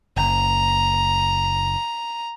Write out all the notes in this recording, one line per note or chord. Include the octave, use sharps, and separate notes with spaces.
F#1 A#5